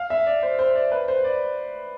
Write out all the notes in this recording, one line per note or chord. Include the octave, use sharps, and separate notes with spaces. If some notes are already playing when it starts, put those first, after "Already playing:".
Already playing: F5
E5
D5
C5
C5
D5
B4
C5
D5